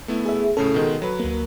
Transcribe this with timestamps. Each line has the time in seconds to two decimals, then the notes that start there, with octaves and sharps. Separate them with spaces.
0.08 A3 B3 E4
0.26 G#4 E5
0.57 A2 C#3 C#4 A4
0.74 B2 D#3 G#3
1.02 F#3 B4
1.19 D2 A#3